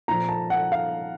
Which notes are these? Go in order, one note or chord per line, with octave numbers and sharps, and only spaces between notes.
A#2 F3 A#5
A5
F#5
F5